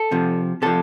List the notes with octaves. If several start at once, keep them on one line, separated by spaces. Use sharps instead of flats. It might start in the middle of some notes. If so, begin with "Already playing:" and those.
Already playing: A4
C3 F3
C3 F3 A4